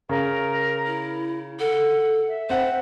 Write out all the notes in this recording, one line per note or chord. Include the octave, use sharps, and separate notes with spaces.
C#3 A#4
E4
A4 F#5
E5
C4 C5 F#5